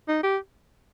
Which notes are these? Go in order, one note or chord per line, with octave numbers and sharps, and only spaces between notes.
D#4
G4